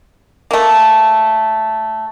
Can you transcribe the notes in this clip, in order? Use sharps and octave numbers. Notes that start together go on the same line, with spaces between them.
A3 A#3